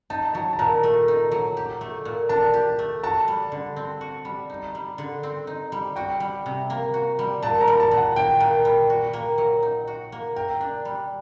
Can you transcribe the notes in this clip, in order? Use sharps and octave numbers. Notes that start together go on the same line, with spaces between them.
D#4 A5
F#3 A5
A5
A#2 A#5
A3
D#4
F#3
G4
A3
A#2
D4 A5
G4
A3
F#4 A5
G3
D3
C4
F#4
G3
D#4
G3
D3
C4
D#4
G3
F#4 G5
G3
C3
A#3
F#4
G3
A#2 A5
A#5
G3
A5
A#2
F#5
A#3 G5
A#2
G3
F#4
A#3
F#3
D#4
F#4
A#3
A#4 G5
D4
G3